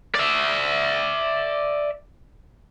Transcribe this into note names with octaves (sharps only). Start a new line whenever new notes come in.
D5 E5